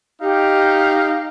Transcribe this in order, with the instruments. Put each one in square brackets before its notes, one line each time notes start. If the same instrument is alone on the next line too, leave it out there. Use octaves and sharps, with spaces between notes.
[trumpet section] D#4 F5 [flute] G4